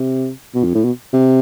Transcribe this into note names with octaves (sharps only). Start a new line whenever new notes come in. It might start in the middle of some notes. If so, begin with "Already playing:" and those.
Already playing: C3
B2
F2
A2
B2
C3